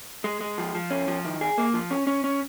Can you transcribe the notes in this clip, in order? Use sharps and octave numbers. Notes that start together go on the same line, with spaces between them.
G#3
G#3
F3
F3
C#4
F3
D#3
G#4
A#3
F3
C#4
C#4
C#4